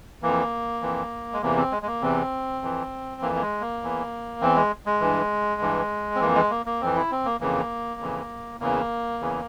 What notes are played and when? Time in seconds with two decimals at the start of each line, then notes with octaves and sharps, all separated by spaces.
0.22 F2 E3 A#3
0.82 F2 E3
1.33 G#3
1.42 E2 C3 E3 A#3
1.57 C4
1.72 G#3
1.82 G#3
1.87 A#3
2.02 E2 C3 E3 C4
2.62 F2 E3
3.22 F2 E3 A#3
3.35 A#3
3.41 G#3
3.61 A#3
3.82 E2 E3
4.41 E2 E3 C4
4.56 G#3
4.86 G#3
5.01 G2 E3
5.61 G2 E3
6.15 C4
6.20 F2 E3 A#3
6.35 G#3
6.51 A#3
6.66 A#3
6.81 F2 E3 C4
6.95 E4
7.11 C4
7.25 A#3
7.41 F2 C#3 E3 A#3
8.00 F2 C#3 E3
8.60 E2 C#3 E3 A#3
9.20 E2 C#3 E3